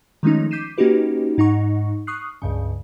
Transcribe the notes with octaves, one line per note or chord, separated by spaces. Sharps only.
D#3 F3 G#3 A3 C#4 D#4
D6 G6 B6 C7 D#7 E7
A#3 C#4 D#4 F#4 G4 B4
G#2 D#4 F#5 C#6
C#6 D#6 F6 F#6 C7
C#2 G2 C#3